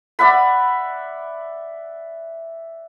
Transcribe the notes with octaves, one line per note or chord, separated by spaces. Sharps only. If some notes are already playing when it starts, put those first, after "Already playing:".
D5 E5 F#5 B5